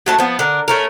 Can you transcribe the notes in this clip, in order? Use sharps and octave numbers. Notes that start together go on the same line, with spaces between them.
F#3 A3 A5
F3 B3
D3 A#4
A3 C#4 A#4